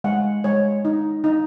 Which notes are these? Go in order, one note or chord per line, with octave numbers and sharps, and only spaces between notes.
G#3 F#5
G#3 C#5
D#4
D#4